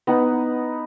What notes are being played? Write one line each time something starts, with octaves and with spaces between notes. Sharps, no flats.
B3 D#4 F#5